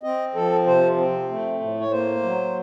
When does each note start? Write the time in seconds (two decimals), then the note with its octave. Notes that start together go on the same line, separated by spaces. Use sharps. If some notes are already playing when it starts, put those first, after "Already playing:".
0.03 C4 D#5
0.35 F3 A4
0.66 C3 C5
0.97 C4
1.29 A3
1.60 A2
1.80 C#5
1.92 A#3 C5
2.23 F#3